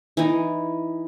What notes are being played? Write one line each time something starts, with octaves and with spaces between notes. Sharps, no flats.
E3 D#4